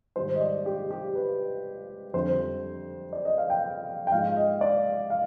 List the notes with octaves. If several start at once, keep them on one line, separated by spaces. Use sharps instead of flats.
G#2 D#3 G3 C5
D#5
D5
G4
G4
B4
F2 D3 G3 C5
D5
D#5
F5
G5
G5
G#2 F3 G#3 F5
D#5
D5
F5